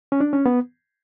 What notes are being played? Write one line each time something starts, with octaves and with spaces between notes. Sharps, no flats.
C#4
D4
C#4
B3